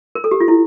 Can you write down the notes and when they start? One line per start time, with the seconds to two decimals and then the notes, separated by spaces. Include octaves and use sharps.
0.15 A#4
0.24 A4
0.31 G4
0.40 F4
0.48 E4